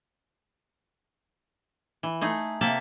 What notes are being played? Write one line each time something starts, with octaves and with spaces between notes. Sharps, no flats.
E3
A3 D#4 G#4
C3 A#3 E5 A5